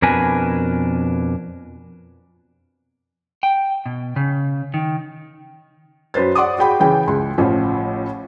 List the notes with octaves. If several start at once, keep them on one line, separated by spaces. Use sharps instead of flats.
F2 B2 D4 A#4 B4 G#5
G5
B2
C#3
D#3
F#2 B4 C5 A6
D5 F#5 C6 D6 D#6
F#4 G#4 G5 B5
C#3 E3 G5
C#2 C6
A1 A2 F3